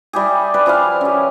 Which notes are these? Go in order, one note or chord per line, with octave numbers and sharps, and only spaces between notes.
G3 E4 G4 G#4
B4 D5 F5
F3 E4 G#4 F5
C#4 G4